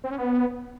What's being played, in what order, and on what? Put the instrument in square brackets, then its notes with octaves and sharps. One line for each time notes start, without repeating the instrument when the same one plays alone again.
[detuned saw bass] C4
C#4
B3